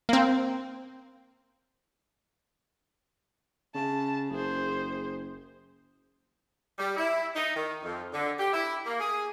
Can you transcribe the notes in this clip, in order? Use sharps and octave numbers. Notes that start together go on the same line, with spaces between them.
A#3 C4
C#3 A5
F#1 G#4 C5
G3
E4
D#4
D#3
F2
D3
G4
E4
A#3
G#4